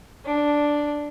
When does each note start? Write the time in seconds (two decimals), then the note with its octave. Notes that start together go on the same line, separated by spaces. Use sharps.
0.25 D4